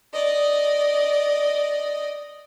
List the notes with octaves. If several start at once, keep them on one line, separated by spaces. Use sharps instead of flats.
D5 D#5